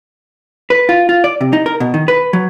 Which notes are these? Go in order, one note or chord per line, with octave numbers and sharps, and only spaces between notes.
B4
F4
F4
D5
C3
D#4
A#4
B2
D#3
B4
F#3